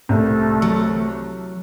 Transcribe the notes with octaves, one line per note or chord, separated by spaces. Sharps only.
C2 A3
F#3